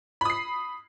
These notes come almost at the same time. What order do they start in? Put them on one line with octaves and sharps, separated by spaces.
B5 D#6 C7